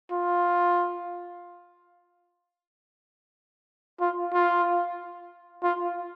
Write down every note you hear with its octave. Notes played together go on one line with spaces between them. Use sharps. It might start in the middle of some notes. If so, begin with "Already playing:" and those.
F4
F4
F4
F4